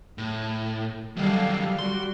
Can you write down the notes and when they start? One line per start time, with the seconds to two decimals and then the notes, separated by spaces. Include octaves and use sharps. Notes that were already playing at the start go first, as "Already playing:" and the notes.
0.18 A2
1.17 D#3 F#3 G3 A4 F5
1.79 G3 F#4 C6